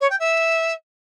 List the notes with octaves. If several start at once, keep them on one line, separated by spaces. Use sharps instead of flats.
C#5
G5
E5